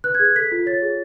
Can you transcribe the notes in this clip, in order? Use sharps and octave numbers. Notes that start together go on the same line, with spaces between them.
B4 F#6
G#6
G#4
G#6
A4 B6
F4
C#5 A6
G#4